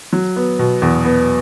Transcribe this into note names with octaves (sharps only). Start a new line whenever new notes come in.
F#3
B3
B2
E2
B3